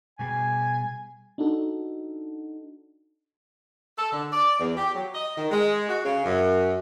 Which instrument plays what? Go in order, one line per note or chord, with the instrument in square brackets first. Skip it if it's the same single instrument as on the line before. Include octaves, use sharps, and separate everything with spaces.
[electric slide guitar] B2 G3 G#4 [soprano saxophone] G#5
[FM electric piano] D4 D#4 F#4 A4
[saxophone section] A4
D3
D5
E2
G4
F#3
D#5
D#3
G#3
F#4
C#3
F#2